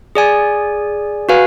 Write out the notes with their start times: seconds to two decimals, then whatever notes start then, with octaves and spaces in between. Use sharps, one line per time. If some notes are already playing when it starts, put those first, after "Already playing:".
0.15 G#4 D5 G#5
1.29 F#4 B4 F5 G#5